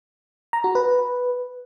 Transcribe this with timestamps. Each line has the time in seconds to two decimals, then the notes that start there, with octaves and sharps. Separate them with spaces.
0.53 A#5
0.64 F#4
0.75 B4